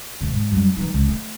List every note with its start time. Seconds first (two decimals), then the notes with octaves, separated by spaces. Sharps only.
0.21 D2 B2
0.33 G#2
0.52 F#2 G3
0.76 E3 D#4
0.94 C#2 C#3
1.08 A3